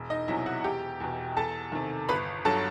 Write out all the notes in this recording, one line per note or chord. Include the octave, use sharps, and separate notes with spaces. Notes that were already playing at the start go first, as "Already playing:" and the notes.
Already playing: E1
D#4 D#5
E2 C3 F#3 E4 E5
F#4 F#5
E1 G4 G5
E2 B2
E2 A4 A5
C3 D#3
G1 B4 B5
G2 F#3 A4 A5